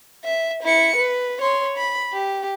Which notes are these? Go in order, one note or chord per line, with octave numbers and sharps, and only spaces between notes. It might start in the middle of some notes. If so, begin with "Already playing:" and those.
E5
E4 C#7
B4
C#5 C6
B5
G4